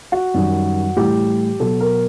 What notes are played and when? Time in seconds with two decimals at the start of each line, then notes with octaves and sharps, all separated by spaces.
0.12 F#4
0.34 F#2 D#3 G3
0.96 A2 E3 G3 G4
1.60 B2 F#3 A4
1.80 A#4